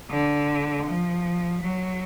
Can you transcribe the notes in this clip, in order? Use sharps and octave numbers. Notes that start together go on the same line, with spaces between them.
D3
F3
F#3